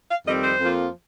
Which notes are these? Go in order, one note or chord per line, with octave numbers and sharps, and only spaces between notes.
F5
F2 D#3 G3 C4 D#5
C5
F2 F3 A#3 F4